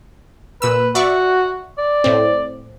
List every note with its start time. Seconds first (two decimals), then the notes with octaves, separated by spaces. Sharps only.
0.62 A#2 B4 E6
0.95 F#4 D5 E5 C#6
1.78 D5
2.04 A2 C4